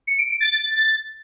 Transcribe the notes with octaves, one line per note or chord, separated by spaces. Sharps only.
C#7
D7
D7
A6